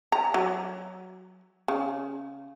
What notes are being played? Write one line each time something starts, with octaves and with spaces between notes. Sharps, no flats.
A#5
F#3
C#3